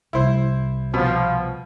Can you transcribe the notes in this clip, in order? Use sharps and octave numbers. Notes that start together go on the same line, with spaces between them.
C2 E4 C5
B2 F3